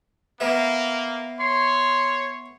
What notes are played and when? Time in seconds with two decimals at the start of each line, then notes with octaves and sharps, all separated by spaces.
0.40 A#3 B3 E5
1.40 C#5 C6